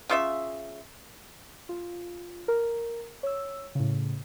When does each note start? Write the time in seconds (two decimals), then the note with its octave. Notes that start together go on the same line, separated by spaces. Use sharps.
0.09 C#3 F4 E5
1.69 F4
2.48 A#4
3.23 C#5 E6
3.75 A2 C#3